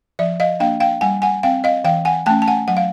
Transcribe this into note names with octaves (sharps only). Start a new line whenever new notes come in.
F3 D5 E5
D#5 F5
A#3 D4 F5 G5
F5 G5
G3 F#5 G#5
F#5 G#5
C4 F5 G5
D#5 F5
E3 F5 G5
F#5 G#5
A3 C#4 G5 A5
A5
F#5 G#5
F#3 F#5
F5